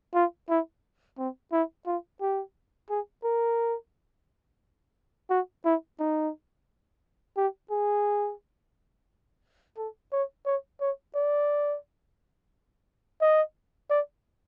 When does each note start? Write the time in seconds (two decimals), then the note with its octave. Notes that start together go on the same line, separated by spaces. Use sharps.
0.15 F4
0.49 E4
1.18 C4
1.52 E4
1.87 F4
2.21 G4
2.90 G#4
3.24 A#4
5.30 F#4
5.65 E4
5.99 D#4
7.37 G4
7.71 G#4
9.77 A4
10.13 C#5
10.46 C#5
10.81 C#5
11.15 D5
13.21 D#5
13.90 D5